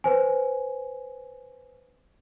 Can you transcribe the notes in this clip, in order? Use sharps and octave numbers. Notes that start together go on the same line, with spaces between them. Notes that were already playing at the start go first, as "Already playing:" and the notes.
B4 C5 G#5